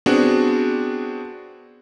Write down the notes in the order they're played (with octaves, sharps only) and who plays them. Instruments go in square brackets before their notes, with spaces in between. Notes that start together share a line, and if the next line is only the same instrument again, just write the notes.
[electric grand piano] B3 C4 D4 F#4 G#4